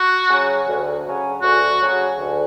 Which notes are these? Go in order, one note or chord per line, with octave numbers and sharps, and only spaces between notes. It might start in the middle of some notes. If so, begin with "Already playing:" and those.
Already playing: F#4
C#3 F#3 C#4 G#4
D2
C#3 F#3 C#4 G#4
D2 F#4
C#3 F#3 C#4 G#4
D2